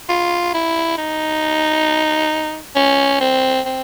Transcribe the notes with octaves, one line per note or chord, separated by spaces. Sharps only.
F4
E4
D#4
C#4
C4
C4